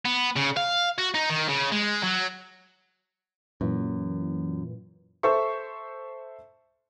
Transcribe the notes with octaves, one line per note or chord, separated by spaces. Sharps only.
B3
C#3
F5
F#4
D#4
D#3
C#3
G#3
F#3
F#2 A#2 E3
A4 C5 E5 C#6